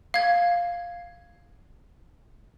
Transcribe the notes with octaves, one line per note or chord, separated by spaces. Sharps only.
F5 G#6